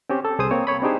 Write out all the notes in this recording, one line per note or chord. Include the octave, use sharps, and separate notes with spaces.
C4 C#4 G4
A4
C2 G#4 C5 D#6
A#3 C4 C#5
C#5 B5
C4 D4 D#4 G4 G#4 C5